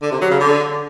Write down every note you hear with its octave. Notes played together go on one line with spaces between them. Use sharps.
D3
C3
F#3
C#3
D3